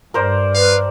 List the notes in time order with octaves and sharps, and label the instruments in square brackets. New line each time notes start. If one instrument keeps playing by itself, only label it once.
[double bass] G2 [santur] A#4 C5 D5
[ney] B4 [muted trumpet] F5